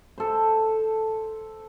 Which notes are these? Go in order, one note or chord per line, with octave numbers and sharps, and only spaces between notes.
A4 C5